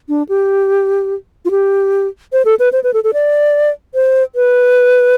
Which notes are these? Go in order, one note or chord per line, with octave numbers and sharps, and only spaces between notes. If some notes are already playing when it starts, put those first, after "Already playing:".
D4
G4
F4
G4
C5
A4
B4
C5
B4
A4
A4
D5
C5
B4